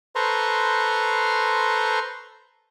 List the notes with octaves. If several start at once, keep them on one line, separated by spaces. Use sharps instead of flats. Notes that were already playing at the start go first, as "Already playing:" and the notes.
A4 B4 C5 A#5 C6 C#6